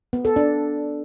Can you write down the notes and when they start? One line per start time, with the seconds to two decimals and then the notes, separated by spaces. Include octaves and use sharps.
0.13 B3
0.25 A4
0.36 D4